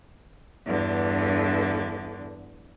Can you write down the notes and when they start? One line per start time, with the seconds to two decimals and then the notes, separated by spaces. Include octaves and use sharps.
0.65 E2 G2 D3